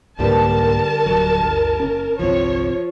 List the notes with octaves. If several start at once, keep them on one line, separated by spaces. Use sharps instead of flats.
C2 G#2 D3 G3 A#3 A#4 B4 A5
D1 C#2 F#3
G1 D2
F#1 C#4
G1 C2 F3 C4 C#5